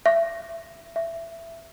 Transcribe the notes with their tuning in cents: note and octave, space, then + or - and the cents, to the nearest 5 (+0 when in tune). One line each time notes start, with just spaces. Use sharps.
E5 +25
E5 +15